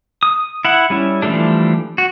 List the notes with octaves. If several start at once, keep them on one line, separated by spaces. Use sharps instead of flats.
D#6
E4 F#5
G3 C#4 E4
E3 F3 G3 A3 D4
F#4